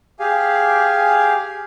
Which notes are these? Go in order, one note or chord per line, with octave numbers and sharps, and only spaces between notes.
G4 G#4 F5 G#5